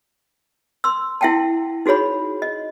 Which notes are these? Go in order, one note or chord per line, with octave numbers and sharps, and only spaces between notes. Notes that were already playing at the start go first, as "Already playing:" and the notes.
C6 E6
E4 E5 F#5 G5 A5
D#4 F#4 G#4 C#5 B5
D#5